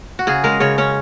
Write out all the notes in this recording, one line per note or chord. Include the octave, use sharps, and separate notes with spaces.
F#4
C#3 G#4
G#3 A#4
C#3 C#5
C#4 C#5